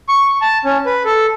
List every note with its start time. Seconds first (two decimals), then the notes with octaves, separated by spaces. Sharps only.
0.09 C#6
0.29 C#6
0.41 A5
0.65 C#4
0.86 B4
1.05 A4